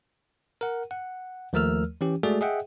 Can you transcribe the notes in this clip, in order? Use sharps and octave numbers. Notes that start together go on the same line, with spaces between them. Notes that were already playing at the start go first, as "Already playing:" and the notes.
A#4 F#5
F#5
D#2 F3 A3 A#4 E6 F6
E3 C#4 G4
G#3 A3 F#4 G#4 A4 D5
G#4 D#5 E5 F#5 G5